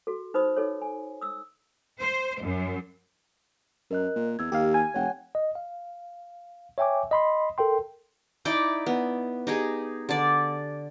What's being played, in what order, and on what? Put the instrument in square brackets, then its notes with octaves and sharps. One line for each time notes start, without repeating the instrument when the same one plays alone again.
[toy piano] F#4 A4
D#4 B4 C5 B5 D#6
D#4 A4 C#5
G#5
D#6 E6
[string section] C5
F#2
[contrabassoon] F#2 [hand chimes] A#4 D#5 F#6
[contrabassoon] A#2
[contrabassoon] E2 [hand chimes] E6 G#6
[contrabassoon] D#2 [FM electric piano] G4 F5
[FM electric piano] G#5
[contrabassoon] F1 [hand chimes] C#5 F#5 G5
[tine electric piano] D#5
F5
C#5 E5 G5 G#5 D6
D#5 B5 C6
A4 A#4 G5 C6
[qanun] D#4 E4 D5 G5
B3
D#4 G4 G#4
D3 D5